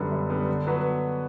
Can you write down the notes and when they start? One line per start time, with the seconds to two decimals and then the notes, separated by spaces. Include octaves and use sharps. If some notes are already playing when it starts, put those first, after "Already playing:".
Already playing: F#2 D3 G3 B3
0.12 F#2
0.30 D3 G3 B3
0.49 D3
0.67 F#3 B3 F#4 B4